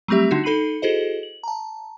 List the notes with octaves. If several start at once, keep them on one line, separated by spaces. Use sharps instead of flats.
F#3 G3 A3 C4 G4 E5
D3 D4 D#4 F#4
D#4 A4 B5 C7 D#7 F#7
E4 F#4 G#4 A4 C5 D#5
F#7
A5 A#5